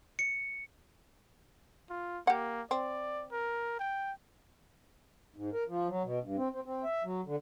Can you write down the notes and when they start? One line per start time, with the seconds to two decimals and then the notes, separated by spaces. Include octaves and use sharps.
0.19 C#7
1.90 F4
2.27 A#3 G4 F#5
2.71 C4 D5
3.32 A#4
3.80 G5
5.36 G#2
5.53 A#4
5.68 F3
5.88 F#3
6.04 B2
6.24 G2
6.37 C4
6.52 C4
6.66 C4
6.84 E5
7.04 F#3
7.26 D3